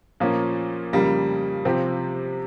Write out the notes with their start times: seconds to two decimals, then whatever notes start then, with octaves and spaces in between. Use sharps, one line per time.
0.20 A#2 F3 A#3 C#4
0.93 F2 C#3 G3 A#3
1.65 C3 F3 C4 G4